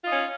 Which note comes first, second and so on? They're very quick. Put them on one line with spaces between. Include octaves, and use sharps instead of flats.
F4 D#4 C#4